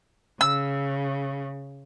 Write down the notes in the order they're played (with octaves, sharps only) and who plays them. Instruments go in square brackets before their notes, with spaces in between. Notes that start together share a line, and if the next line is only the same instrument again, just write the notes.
[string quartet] C#3 [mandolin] E6